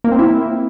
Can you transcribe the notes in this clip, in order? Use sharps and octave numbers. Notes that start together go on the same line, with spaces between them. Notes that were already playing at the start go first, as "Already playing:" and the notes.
A#3
C4
E4